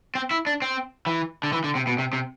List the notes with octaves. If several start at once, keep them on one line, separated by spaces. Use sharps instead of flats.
C4
E4
D4
C4
E3
D3
E3
D3
C3
B2
C3
C3